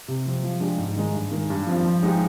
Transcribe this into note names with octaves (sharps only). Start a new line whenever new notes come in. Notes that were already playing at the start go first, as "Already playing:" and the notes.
C3
F3 C4
F3
G#3 D4 G4
G#2
D#3 G#3 D#4
G2
D#3 G#3
G2
F3 C4 F4
F3
G#3 D#4 G4